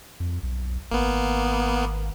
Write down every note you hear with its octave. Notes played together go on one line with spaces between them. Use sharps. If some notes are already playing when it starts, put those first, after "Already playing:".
F2
B1
G#1 A#3 B3